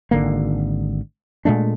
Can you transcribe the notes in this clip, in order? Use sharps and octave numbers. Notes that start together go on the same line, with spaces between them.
G#1 D3 A#3
A#2 G#3 A3 D4